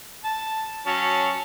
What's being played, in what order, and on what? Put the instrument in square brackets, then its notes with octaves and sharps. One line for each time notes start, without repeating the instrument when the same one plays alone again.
[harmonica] A5
F#3 C#4 A5